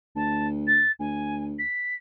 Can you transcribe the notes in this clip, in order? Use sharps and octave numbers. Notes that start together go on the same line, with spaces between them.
D2 A5
A6
D2 G#5
B6